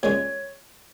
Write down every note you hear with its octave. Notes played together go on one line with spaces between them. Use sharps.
A#2 G#3 C#4 C#5